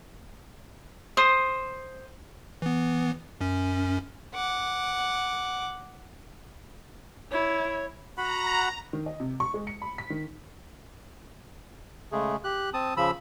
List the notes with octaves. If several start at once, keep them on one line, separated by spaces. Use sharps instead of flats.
C5 D#6
E3 B3
F#2 C#4
F#5 D6
E4 C#5
F#4 F#5 A#5 B5
D#3
D#5
C3
C#6
G#3
C#7
B5
B6
D#3
C#3 G#3 A3 G#4
G4 F#6
C4 A5 D#6
C#3 F3 B5 E6